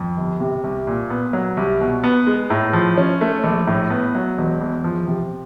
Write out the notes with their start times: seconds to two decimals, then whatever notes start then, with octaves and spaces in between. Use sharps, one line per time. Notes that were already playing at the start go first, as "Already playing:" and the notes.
Already playing: F2
0.17 G1
0.40 C3
0.64 C2
0.87 A#2
1.10 B3
1.33 F#3
1.57 C2
1.81 B2
2.04 B3
2.27 G#3
2.50 A2
2.73 F3
2.98 C#4
3.21 A3
3.44 A#1
3.67 A2
3.90 B3
4.15 F#3
4.38 E1
4.61 E2
4.84 F3
5.07 C3